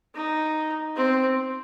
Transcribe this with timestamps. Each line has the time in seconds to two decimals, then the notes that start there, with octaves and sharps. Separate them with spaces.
0.15 D#4
0.95 C4